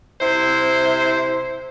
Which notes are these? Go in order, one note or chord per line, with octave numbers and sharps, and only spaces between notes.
C3 E4 C5